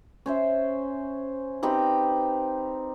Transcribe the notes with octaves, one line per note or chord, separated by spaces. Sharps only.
C#4 C5 E5
C4 D#4 G4 B4